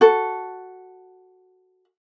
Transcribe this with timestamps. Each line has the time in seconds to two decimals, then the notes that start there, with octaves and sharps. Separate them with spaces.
0.01 F#4 A4